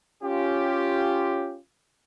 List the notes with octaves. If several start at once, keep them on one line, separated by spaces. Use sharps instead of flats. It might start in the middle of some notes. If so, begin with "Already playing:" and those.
C#4 F4 G4